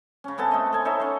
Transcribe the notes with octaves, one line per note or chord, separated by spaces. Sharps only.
C#3 C#4
C3 B3 A4 A5
A3 D#5
A4 G#5
D#4 A4 C#5 E5
C#4 C5